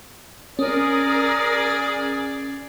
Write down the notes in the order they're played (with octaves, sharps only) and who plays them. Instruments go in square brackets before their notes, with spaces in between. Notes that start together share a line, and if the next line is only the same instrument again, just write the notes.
[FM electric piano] C#4 [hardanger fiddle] G#4 D5 [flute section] A#4 D#6